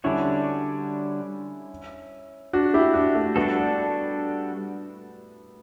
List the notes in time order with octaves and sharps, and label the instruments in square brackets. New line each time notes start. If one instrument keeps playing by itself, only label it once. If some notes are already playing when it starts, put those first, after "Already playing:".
[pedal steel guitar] D3 G3 D4 F#4 C#5 [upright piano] C#4 E4
[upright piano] D4 F#4
E4 G4
D4 F#4
A3
[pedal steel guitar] G3 D4 F#4 A4 [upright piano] B3